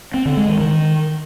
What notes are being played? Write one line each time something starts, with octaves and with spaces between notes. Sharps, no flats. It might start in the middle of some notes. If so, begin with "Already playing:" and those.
C4
D3
G#3
D#3
D#3